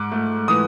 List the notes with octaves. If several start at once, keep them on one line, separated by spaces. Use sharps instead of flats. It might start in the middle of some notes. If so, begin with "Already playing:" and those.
Already playing: G#2 D6
A3
E3 D#6